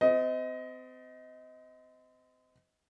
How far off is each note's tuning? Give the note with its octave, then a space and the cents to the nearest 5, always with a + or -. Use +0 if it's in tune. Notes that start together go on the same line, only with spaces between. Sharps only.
C4 -35 D#5 +20